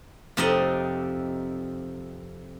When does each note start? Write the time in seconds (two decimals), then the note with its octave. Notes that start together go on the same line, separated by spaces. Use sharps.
0.37 F2 C3 C4 D#4 D5 D#5